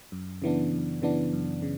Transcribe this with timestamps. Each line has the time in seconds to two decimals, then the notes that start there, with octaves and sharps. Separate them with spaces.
0.12 F#2
0.42 C#3 E3 B3 D4
0.72 F#2
1.02 C#3 E3 B3 D4
1.33 F#2
1.62 C#3